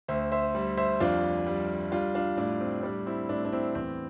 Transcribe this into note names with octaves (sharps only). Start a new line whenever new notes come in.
D2 C5 E5
C5 E5
G3
C5 E5
F2 D4 F4
G3
G3 D4 F4
D4 F4
A2 D4
C4
G3 D4
C4 E4
A2 D4
D4
C4 E4
E2 C4